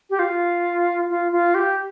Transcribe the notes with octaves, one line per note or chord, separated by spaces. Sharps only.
G4
F4
F4
F4
G4